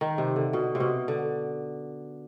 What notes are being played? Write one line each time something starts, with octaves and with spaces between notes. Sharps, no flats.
D#3
C3
D3
B2
C3
B2
D3